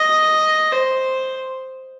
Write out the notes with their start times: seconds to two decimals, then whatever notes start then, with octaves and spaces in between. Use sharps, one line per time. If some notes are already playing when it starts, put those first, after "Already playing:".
Already playing: D#5
0.72 C5